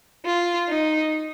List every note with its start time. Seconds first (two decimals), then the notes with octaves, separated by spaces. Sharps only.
0.26 F4
0.69 D#4